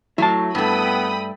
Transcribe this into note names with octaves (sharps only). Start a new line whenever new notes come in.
F#3 A3 E4 A5
G2 A3 B3 G5 B5 D#6